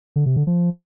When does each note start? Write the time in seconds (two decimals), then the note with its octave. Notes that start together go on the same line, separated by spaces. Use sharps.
0.16 D3
0.26 C3
0.36 D3
0.47 F3